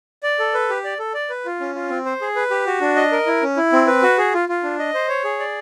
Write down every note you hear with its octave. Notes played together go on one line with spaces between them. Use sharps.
D5
A4
B4
G4
D5
A4
D5
B4
F4
C#4
F4
C4
C5
G#4
B4
G4
F#4
D4
D#5
A#4
E4
C#4
E4
C4
B4
F#4
G#4
F4
F4
D4
D#5
C5
C#5
G#4
D5